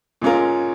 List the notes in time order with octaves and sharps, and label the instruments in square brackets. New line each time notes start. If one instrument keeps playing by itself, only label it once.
[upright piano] A#2 G#3 C#4 F4 A#4